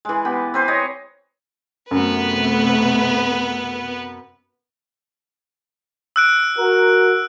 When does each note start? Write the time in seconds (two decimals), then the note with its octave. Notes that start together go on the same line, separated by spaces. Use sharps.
0.05 E3 G#3
0.25 B3 G4
0.54 C4 B4 C5
0.68 C#5 D#5
1.91 F#2 C3 A3 B3 B4
6.16 E6 F#6 D7
6.58 F#4 A#4